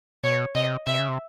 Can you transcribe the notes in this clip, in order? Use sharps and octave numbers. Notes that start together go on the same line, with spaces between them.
B2 C#5
C3 D#5
C3 E5
C#3
C3